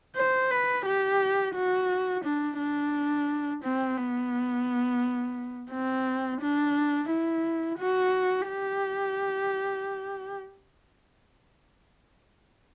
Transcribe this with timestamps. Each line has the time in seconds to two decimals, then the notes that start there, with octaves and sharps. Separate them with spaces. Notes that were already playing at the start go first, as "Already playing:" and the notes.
0.16 C5
0.51 B4
0.86 G4
1.55 F#4
2.24 D4
2.59 D4
3.64 C4
3.97 B3
5.71 C4
6.41 D4
7.10 E4
7.79 F#4
8.48 G4